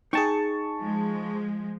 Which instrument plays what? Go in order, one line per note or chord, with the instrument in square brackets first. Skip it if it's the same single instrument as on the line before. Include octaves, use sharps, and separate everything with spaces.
[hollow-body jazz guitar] D#4 G5 [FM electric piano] G#4 A5 C#6
[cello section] F3 G#3